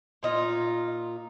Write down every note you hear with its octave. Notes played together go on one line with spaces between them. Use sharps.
A#2 D#4 F4